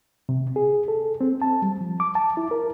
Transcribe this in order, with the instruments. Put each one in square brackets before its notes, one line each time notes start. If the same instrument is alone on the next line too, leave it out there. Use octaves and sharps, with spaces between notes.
[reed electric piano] C3
G#4
A4
C4
A5
G3
F3
D6
A5
E4
A#4